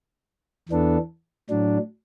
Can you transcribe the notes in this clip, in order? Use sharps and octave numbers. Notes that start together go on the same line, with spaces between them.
E2 E3 B3 D4 A4
A2 F#3 D4